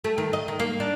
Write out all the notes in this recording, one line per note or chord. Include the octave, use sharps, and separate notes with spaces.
A3
D#3
D#5
D#3
A#3
D4